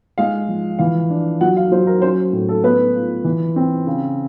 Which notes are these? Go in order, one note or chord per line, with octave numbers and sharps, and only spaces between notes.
G#3 F5
F3
E3 F5
D4
F#3 F#5
F5
F#3 C5
A#4
C#4 C5
A2
A4
B3 B4
F4
E3
C4
C#3